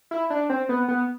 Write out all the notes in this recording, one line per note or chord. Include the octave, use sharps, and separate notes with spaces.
E4
D4
C4
B3
B3